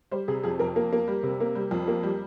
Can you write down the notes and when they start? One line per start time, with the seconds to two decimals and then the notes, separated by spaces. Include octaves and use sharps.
0.11 G3 C5
0.28 C3 G#4
0.43 F2 G#4
0.59 F2 A#4
0.76 A#3
0.93 A#3
1.08 G3
1.23 C3
1.40 A#3
1.55 G3
1.71 F2
1.88 A#3
2.03 G3